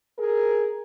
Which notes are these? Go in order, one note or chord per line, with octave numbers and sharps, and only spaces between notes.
G#4 A#4